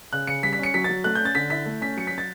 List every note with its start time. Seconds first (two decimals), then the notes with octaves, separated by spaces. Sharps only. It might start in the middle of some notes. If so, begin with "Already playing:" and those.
0.13 C#3 F#6
0.27 C#3 C#7
0.43 G3 B6
0.53 B6
0.59 C#4 C#7
0.74 F#3 B6
0.84 F#3 A6
1.04 A3 F#6
1.15 G6
1.21 C#4 A6
1.35 D3 B6
1.50 E4 B6
1.66 A3
1.81 C#4 B6
1.97 F#3 C#7
2.07 F#3 B6
2.18 A6